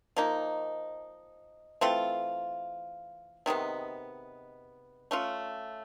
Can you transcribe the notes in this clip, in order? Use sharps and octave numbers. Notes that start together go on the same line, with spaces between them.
F3 A#3 D#4
E3 A3 C4 F4
C3 D#3 G#3 B3
A3 C#4 F4